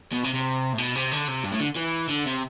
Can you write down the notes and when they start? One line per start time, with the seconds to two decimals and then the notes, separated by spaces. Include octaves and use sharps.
0.13 B2
0.24 C3
0.34 C3
0.74 A2
0.78 B2
0.95 C3
1.12 D3
1.28 C3
1.44 G2
1.52 A2
1.60 D3
1.76 E3
2.09 D3
2.27 C3